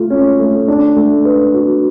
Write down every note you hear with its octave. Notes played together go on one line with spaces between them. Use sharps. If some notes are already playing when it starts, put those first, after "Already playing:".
Already playing: A3 F4
C#4
A3
D4
A3
B4
F#4